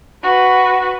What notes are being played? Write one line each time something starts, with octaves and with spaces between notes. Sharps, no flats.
F#4 B4